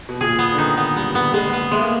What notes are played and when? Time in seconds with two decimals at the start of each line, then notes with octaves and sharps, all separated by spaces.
0.09 B2
0.21 A#2 G#4
0.39 B3
0.54 D3
0.58 D#3 D#4
0.77 B3
0.96 G3 B3
1.15 B3
1.34 G#3 B3
1.53 B3
1.71 G#3 A3
1.82 A#3